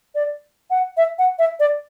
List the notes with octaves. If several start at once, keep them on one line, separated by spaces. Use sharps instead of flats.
D5
F#5
E5
F#5
E5
D5